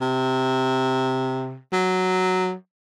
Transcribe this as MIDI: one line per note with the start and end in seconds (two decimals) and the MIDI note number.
0.01 1.58 48
1.73 2.54 54